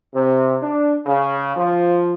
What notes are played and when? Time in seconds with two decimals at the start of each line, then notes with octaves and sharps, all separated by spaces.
0.13 C3
0.62 D4
1.06 C#3
1.55 F3